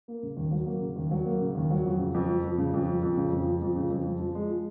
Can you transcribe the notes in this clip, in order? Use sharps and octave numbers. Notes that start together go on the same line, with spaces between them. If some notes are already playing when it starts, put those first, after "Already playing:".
A#3
C#3
D#2
F#3
A#3
C#3
D#2
F#3
A#3
C#3
D#2
F#3
F2
C#3
F2
F3
F2
C#3
F2
F3
F2
C#3
F2
F3
F2
C#3
F2
F3
F3
G#3
F3